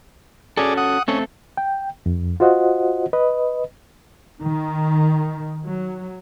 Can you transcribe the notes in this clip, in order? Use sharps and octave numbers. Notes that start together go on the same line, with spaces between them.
C#4 F#4 G#4 A4 D5
F#5 D#6
A3 C4 C#4 A4
G5
F2
F4 F#4 C5 D#5 F#5
B4 D#5
D#3
F#3